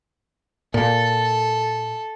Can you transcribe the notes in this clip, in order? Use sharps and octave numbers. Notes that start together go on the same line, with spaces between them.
A#2 A4